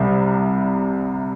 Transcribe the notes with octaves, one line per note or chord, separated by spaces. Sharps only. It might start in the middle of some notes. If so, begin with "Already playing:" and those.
Already playing: C2 C3 G3